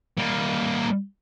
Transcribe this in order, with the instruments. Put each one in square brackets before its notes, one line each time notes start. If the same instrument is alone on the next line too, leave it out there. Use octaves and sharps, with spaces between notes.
[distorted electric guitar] G3 A#3